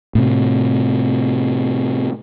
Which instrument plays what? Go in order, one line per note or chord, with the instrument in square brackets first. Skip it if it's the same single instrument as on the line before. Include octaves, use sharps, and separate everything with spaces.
[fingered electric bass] A2 C3